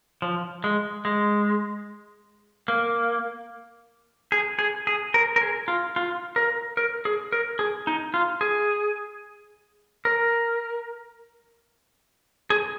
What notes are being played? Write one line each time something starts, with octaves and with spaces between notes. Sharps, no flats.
F3
G#3
G#3
A#3
G#4
G#4
G#4
A#4
A#4
G#4
F4
F4
A#4
A#4
G#4
A#4
G#4
D#4
F4
G#4
A#4
G#4